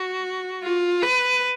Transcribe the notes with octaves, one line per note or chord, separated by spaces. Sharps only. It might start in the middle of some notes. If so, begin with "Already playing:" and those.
Already playing: F#4
F4
B4